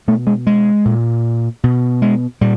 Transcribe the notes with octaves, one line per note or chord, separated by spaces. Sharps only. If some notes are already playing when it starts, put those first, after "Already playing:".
B2 A3
G#3
G#3
A#2
B2
G#3
A#2 G3